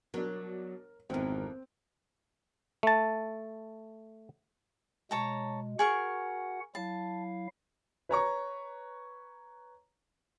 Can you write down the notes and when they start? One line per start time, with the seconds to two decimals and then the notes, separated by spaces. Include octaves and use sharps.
0.14 B2 F#3 D4 A#4
1.10 G#1 F2 E3 B3 C4 A#4
2.83 A3 A5
5.11 B2 G#3 C#5 A5 A#5
5.79 F#4 G#4 A#4 F#5 C#6
6.75 F#3 E4 F5 A5
8.09 B4 C#5 A#5 C#6